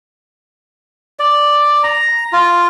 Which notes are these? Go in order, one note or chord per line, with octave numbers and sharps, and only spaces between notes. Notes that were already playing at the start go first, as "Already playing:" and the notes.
D5
A#5
F4